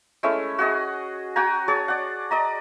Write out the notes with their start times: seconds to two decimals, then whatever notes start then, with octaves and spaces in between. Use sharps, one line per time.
0.23 G#3 A3 C#4 E4
0.58 F#4 G#4 D#5
1.36 F#4 G5 G#5 A#5
1.68 G#4 C#5 A5
1.88 D5 F#5
2.31 D5 D#5 A#5